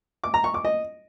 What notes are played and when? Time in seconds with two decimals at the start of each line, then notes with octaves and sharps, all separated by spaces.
0.24 D6
0.34 A#5
0.44 C#6
0.54 D6
0.65 D#5